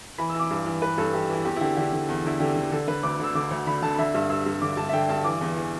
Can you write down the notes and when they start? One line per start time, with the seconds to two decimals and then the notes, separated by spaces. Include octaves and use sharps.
0.18 E3 B5
0.30 E6
0.35 E3 D6
0.51 G2
0.66 E3
0.82 G2 B4
0.98 G2 A4
1.13 E3 G4
1.30 E3 E4
1.45 E2 G4
1.56 E4
1.61 D3 G4
1.77 D3 G4
1.93 D3
2.09 E2
2.24 D3 E4
2.40 D3 G4
2.56 D3
2.72 D3 A4
2.88 D3 B4
3.03 D2 D6
3.19 D3 E6
3.35 D3 D6
3.51 D2
3.67 D3 B5
3.82 D3 A5
3.98 D3 E5
4.14 G2 E5
4.30 G2 E6
4.46 G2
4.61 D3 D6
4.77 G2 A5
4.89 E5
4.93 D3 G5
5.09 G2 A5
5.24 E3 D6
5.41 E2
5.56 E3